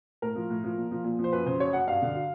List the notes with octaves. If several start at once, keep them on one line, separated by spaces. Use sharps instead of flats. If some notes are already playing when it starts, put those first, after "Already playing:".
A2 A#4
F3
A2
F3
A#2
F3
A#2
F3
C5
F#2 B4
C#3 C5
F#3 C#5
F#2 F#5
G2 F5
D3
F#3